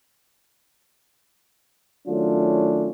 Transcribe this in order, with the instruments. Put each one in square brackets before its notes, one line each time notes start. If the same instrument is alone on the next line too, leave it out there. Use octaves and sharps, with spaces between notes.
[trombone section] D#3 F#3 A3 C#4 D4 F4